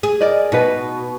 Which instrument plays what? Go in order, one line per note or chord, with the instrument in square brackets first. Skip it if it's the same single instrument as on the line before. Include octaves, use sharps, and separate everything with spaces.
[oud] G#4
[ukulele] A#4 D5 D#5
[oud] B2 [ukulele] D#4 F#4 B4